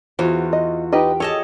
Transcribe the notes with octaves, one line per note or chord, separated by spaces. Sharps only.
E2 F4 F#4 C5
D#5
D#4 G4 B4 D#5 G5
G#4 A4 C#5 D#5 A5